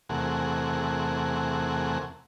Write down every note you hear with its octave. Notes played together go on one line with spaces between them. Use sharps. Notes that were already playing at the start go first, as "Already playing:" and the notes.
E2 C3 A3 G#4 A#4 F#5